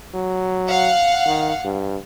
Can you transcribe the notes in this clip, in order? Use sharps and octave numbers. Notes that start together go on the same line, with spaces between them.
F#3
F5 F#5
D#3
G2